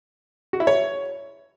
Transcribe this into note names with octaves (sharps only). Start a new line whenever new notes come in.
F#4
E4
C#5